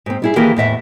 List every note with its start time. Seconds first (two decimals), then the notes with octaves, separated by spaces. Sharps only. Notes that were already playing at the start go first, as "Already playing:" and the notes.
0.06 G#2 C4
0.22 G3 E4 G#4
0.36 D#3 E3 A#3 G4 G#4
0.56 E2 A2 E5 F#5